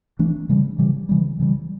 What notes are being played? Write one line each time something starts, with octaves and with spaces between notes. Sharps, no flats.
E3 A3 D4
C#3 E3 G3
C#3 E3 G3
C#3 E3 G3
C#3 E3 G3